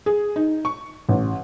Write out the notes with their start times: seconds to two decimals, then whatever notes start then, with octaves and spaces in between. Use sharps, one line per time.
0.06 G#4
0.36 D#4
0.65 C#6
1.09 A1